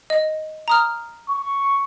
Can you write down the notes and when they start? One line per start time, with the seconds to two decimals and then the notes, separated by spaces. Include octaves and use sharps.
0.10 D#5
0.68 A#5 D#6 F6
1.30 C#6